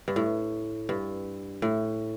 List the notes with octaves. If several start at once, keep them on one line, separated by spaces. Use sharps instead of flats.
G2
A2
G2
A2